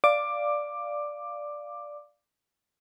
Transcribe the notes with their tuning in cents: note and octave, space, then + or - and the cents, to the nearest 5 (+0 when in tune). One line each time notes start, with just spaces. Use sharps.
D5 +0 F5 -5 D6 +10